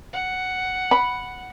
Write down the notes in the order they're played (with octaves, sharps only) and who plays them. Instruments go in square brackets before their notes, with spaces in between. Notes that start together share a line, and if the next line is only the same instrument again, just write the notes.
[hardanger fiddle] F#5
[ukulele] B5